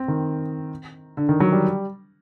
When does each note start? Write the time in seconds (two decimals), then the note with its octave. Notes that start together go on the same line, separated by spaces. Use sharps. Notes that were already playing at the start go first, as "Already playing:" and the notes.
Already playing: C4
0.08 D#3
1.17 D3
1.29 D#3
1.40 F#3
1.52 G3